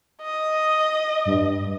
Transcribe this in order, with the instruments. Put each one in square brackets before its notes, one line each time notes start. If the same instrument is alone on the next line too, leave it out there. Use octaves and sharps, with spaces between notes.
[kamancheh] D#5
[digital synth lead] G2